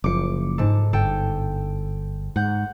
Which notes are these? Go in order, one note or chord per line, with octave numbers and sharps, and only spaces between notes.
F#1 B2 F3 D6 C#7
G#2 A4
G1 A4 G5
G#2 F#5 G6